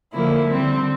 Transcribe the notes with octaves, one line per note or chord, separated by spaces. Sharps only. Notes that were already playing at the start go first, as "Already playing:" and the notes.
D3 F3 A#3 E4
D3 G3 C4